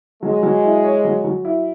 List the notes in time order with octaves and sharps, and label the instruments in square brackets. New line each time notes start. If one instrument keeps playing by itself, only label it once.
[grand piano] F#3 [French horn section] G#3
[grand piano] F#3
E4
C#5
F#3
F#3
E4